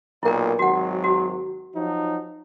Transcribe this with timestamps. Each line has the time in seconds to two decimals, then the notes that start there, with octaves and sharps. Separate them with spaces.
0.23 B1 A#2 E4 A#4
0.59 G#1 F#3 F#4 F#5
1.04 F#4
1.76 F3 F#3 D#4